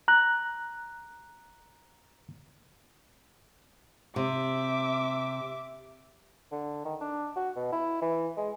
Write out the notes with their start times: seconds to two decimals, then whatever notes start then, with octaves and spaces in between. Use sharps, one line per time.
0.08 A#5 F#6
4.16 C3 E5 D6
6.52 D3
6.85 D#3
7.01 D4
7.36 F#4
7.56 B2
7.72 E4
8.02 E3
8.37 G#3